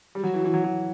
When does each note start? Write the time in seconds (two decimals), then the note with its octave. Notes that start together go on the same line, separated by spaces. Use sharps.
0.15 G3 G4
0.23 F#3 F#4
0.34 E3
0.44 E3
0.54 F#3
0.64 F#3